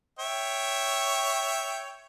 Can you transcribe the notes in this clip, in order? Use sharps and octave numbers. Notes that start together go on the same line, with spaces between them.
C#5 E5 G5